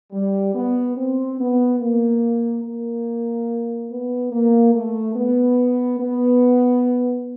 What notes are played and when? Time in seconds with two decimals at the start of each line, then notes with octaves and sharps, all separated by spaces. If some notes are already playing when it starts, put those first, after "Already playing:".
0.12 G3
0.53 B3
0.96 C4
1.38 B3
1.80 A#3
2.63 A#3
3.89 B3
4.30 A#3
4.73 A3
5.14 B3
5.98 B3